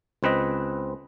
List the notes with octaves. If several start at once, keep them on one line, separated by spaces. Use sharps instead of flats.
C#2 C4 B4 D#5